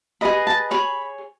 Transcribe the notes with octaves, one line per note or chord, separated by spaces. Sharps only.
G#4 B4 D#5 B5
A5
G#4 C#5 B5